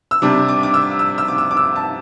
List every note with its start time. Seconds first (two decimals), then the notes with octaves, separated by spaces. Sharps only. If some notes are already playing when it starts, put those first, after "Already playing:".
0.11 E6
0.22 C3 G3 D4 D6
0.49 D6
0.63 D6
0.74 E6
0.99 E6
1.18 E6
1.28 D6
1.38 E6
1.51 D6
1.57 E6
1.76 A5